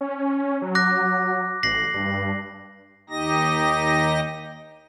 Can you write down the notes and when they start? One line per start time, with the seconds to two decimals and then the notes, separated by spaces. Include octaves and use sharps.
0.01 C#4
0.62 F#3
0.75 D6 F#6 A#6
1.63 A1 A#6 C7 F#7
1.94 G2
3.10 D#2 D#4 G4 D#5 A#6